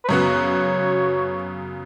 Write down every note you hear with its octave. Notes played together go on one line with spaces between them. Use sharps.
B4
F#2 C#3 F#3 B3 F#4 C#5